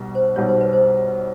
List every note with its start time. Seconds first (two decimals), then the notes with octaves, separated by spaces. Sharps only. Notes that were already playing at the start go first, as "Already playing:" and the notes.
Already playing: B1 B2 G3
0.15 C5
0.36 B1 B2 G3 C#5
0.48 C5
0.61 B4
0.73 C5